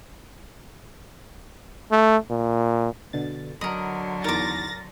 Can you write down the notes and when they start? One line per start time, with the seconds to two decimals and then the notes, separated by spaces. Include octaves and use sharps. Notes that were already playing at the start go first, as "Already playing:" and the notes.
1.91 A3
2.30 A#2
3.13 B2 D3 A6
3.61 D3 F#3 A#4 D#5 B5
4.24 E2 D#3 A#4 D6 A6 A#6